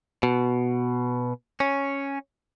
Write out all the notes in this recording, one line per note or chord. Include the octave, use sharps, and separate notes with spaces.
B2
C#4